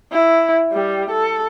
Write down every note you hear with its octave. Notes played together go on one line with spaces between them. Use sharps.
E4
G3
A4